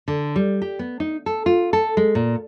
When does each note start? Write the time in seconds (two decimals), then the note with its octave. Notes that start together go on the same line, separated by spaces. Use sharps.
0.08 D3
0.36 G3
0.62 G4
0.79 B3
1.00 D#4
1.26 A4
1.46 F4
1.73 A4
1.97 G#3
2.15 A#2